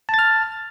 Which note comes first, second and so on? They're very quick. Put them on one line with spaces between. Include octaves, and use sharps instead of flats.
A5 A6 F6